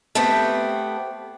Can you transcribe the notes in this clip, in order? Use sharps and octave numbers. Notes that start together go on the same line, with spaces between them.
A3 B3 C4 G4